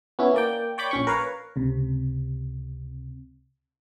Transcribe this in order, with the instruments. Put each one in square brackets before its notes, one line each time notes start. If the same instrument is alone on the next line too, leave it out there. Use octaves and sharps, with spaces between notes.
[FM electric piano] B3 C#4 E4
A#3 D5 G5
C#5 D5 G5 B5 D6
A#1 C#4 C#6
A#4 B4 C#5 F5
C#2 C3